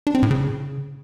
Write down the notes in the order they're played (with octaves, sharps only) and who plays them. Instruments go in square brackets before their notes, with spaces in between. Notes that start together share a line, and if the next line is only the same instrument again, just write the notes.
[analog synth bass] D4
C4
A2
C#3